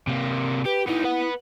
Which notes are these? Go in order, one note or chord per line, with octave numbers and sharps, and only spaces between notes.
C3 A#3
G4 B4
B3 D#4 E4
B4 F#5